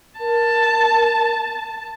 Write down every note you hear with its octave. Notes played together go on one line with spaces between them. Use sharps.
A#4 A5